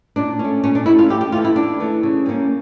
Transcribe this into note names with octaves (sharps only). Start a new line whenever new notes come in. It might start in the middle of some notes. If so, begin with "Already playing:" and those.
A#2 D4
C#4
A3
A#2 C#4
D4
A3 C#4 E4
F4
F2 G4
G4
E3 A3 F4
E4
F2 D4
E3 A3
C#3
G3 A#3 C#4